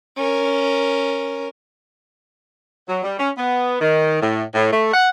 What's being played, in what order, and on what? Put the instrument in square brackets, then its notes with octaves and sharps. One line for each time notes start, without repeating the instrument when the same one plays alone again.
[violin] C#4 A#4
[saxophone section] F#3
G3
C#4
B3
D#3
A2
A2
A3
F#5